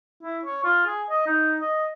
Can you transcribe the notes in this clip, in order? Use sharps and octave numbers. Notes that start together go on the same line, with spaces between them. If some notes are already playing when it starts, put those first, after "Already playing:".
E4
C#5
F4
G#4
D#5
D#4
D#5